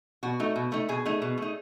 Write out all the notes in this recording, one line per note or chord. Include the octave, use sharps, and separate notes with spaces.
B2 F#4
A3 D#4
B2
A3 D#4
B2 G#4
A3 D#4
B2
A3 D#4